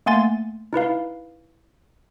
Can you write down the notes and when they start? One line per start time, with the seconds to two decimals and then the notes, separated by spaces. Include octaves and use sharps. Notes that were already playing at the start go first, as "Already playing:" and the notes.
0.06 A3 A#3 F#5 G#5 C6 A6
0.73 D#4 E4 B4 F5